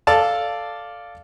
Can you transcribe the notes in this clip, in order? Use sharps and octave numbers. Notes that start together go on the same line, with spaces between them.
A4 D5 F5 A5